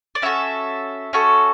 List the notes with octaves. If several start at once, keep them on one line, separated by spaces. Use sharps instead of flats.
D5
C#4 E4 F#4 A4 E5
C#4 F#4 A4